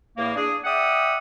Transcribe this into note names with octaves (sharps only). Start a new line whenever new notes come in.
E2 A2 A#3
D4 G#4
D5 E5 F#5 G5 D#6